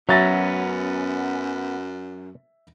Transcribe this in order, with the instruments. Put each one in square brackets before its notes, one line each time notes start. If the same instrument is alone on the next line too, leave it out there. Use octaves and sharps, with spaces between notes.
[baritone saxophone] F#2 [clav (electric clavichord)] F#3 [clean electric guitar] B3 C#4 [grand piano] E5 A6 A#6